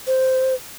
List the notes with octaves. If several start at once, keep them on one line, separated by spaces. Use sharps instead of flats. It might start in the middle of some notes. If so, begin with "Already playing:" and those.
C5